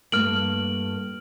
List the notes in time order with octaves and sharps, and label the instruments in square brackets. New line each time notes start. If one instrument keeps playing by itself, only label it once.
[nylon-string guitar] G2 A3 A#3 [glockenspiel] F6 D7 F#7